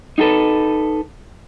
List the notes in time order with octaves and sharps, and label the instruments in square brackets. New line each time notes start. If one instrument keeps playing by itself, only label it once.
[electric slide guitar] D#4 F4 G#4 A4 B4